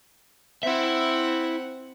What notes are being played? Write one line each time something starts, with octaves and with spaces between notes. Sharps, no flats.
C4 E4 E5 F#5